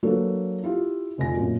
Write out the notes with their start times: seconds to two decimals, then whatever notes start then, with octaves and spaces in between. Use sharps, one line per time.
0.03 F#3 A#3 D4 A4 B4
0.63 E4 F4 G4
1.18 F1 F2 G#5 A#6
1.37 F#2 A#2